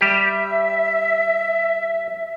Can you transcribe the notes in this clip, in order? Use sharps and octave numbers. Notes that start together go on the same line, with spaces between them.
G3 G4 E5